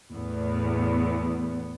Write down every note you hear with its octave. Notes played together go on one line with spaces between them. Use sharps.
E2 A2 B3